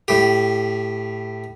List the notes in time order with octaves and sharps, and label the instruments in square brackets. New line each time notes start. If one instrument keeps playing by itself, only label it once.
[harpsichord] A2 G4